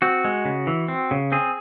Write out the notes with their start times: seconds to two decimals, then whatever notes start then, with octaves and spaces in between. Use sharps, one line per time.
0.02 C4 F#4
0.25 G#3
0.45 C#3
0.67 E3
0.88 C4
1.11 C#3
1.32 C4 G#4